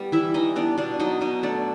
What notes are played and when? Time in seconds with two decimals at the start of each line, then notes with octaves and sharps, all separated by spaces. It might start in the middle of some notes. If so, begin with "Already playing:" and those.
Already playing: G3 B3
0.12 E3 E4 E5
0.34 E3 D#4 D#5
0.56 B3 D4 D5
0.77 B2 D4 D5
0.99 F#3 D#4 D#5
1.21 B2 D#4 D#5
1.43 A3 D4 D5